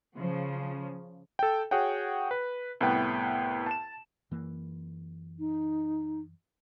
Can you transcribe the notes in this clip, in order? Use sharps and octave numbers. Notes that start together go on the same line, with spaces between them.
C#3 F3
A4 G5
F#4 G#4 C#5 F#5 G5
B4
C2 A2 B3 B4 G5
A5 E7
F#2 E3 A#3
D#4